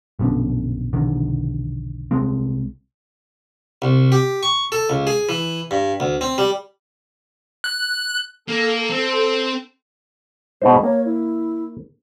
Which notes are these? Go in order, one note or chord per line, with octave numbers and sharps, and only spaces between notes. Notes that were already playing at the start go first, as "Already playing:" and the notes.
A#1 F#2 B2 D3
F1 B1 D3 D#3
C2 G#3 C4
C2
G4
C#6
A4
C#2
G#4
E3
G2
D2
C4
G3
F#6
A#3 A4
C4
B2 G#3 D#4 C5
A#3 C#5
E4